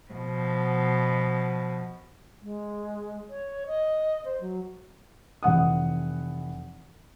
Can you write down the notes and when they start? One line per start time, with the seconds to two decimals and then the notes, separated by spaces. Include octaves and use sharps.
0.11 B2 F3
2.42 G#3
3.30 C#5
3.67 D#5
4.25 C5
4.41 F#3
5.43 F1 E3 F#5 D#6